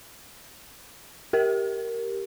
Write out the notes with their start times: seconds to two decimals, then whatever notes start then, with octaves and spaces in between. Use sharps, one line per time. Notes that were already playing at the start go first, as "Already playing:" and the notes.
1.33 G4 A#4